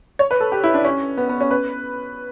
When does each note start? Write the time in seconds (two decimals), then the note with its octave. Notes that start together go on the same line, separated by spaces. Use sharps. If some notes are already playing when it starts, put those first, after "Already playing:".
0.19 C#5
0.31 B4
0.40 A4
0.52 G4
0.64 E4
0.74 D4
0.85 C#4
1.18 B3
1.29 B3
1.40 C#4
1.51 B4